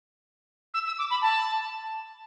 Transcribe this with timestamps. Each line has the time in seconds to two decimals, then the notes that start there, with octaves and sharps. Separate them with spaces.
0.74 E6
0.86 E6
0.98 D6
1.10 B5
1.22 A5